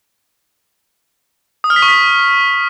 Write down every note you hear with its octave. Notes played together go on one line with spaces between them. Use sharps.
D#6
F6
B6
C#6
B6